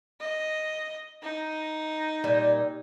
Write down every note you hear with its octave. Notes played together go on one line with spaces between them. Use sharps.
D#5
D#4
A#2 G3